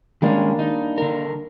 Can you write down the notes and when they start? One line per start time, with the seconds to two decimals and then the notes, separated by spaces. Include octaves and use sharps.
0.22 D#3 G3 G#3 A#3 C#4 D4
0.59 D#4
0.98 D3 A#4